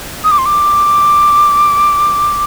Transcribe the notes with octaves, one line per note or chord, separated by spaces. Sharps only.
D#6
D6
C6
D6